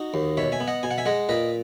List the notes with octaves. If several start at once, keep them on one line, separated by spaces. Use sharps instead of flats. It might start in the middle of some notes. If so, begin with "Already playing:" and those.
Already playing: D#4 F#4
D#2
B2 C#5 E5
E5 G#5
B3
D#5 F#5
B2 G#5
F#5
E5 G#5
G#3 D#5 F#5
A#2 B4 D#5